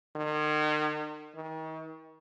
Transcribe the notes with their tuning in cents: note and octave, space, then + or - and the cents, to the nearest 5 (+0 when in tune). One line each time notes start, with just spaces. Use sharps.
D#3 -40
D#3 +40